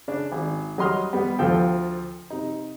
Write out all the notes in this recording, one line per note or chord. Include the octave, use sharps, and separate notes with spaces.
C#3 D4
G#1
F#3 G3 D#5 C6 D#6 F6
G3 B3
D2 F3 F4 A4 G5
C3 D#4